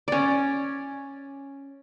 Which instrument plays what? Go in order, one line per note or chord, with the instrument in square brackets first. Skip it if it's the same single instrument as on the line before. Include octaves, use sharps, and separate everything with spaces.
[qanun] C#4 D5